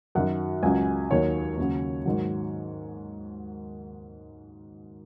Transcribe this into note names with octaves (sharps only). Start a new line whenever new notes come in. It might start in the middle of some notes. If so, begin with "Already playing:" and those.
F#2 D#3 F#3 F#5
C#2 C#3 F#3 G#5
D#2 D#3 F#3 C#5
D#2 C#3 F#3
G#2 D#3 F#3